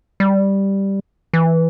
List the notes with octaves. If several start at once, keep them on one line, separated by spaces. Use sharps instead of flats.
G3
E3